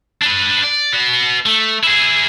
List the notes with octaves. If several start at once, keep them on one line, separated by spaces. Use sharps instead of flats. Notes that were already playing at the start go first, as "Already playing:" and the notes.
D4 B4
D5
B3 F#4
A3
E4 G#4